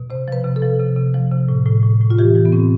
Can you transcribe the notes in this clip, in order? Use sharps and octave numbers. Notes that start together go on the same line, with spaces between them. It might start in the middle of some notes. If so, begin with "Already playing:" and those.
Already playing: B2
C3 C5
F3 B4
C3
A4
F3
C3
C3
F3
C3
A2
A2
A2
A2
F4
E3 G4
E3
B3
A2 C4